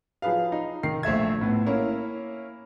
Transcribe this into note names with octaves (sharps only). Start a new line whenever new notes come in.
F3 F#3 G#4 B4 F5
D#4
D#3 C7
A#1 A3 E5 G#6
A2 B3
A#3 C#4 E4